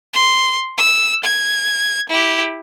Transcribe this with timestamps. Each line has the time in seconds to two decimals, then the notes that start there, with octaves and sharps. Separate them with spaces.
0.13 C6
0.78 E6
1.24 G#6
2.09 E4 G4